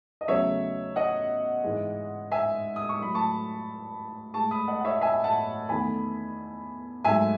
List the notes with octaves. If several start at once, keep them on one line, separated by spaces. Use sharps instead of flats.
D#5
E2 C#3 F#3 A3 C#5 E5
D#5 F#5
G#2 E3 G#3
E5 G#5
D#6
C#6
A2 F#3 A3 B5
A5 C#6
A2 G#3 A5 C#6
B5 D#6
D#5 F#5
F#5
C#5 E5
E5 G#5
F#5 A5
E2 D#3 A3 G#5 B5
G#2 F#3 A3 E5 G#5